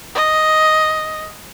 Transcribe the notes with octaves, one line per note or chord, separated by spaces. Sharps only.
D#5